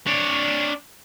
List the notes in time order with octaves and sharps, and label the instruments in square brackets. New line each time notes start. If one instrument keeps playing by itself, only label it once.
[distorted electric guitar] D4 C#5